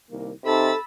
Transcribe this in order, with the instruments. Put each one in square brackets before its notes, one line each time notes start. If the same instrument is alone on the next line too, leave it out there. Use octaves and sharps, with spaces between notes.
[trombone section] C2 D#3 A#3
[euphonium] C3 [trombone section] D#4 [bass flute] A4 [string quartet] B5 E6 A6